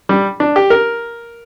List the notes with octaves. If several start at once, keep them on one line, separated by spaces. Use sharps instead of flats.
G3
D4
G4
A#4